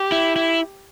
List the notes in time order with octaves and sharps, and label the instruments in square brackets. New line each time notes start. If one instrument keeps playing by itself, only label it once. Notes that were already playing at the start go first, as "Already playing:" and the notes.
Already playing: [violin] G4
[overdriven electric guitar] E4
E4